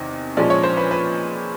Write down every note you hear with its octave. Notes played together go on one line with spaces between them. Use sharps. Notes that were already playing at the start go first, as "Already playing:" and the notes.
Already playing: E2 C3 D#3
A#2 F3 G#3 C#4 D5
C#5
C5
B4
B4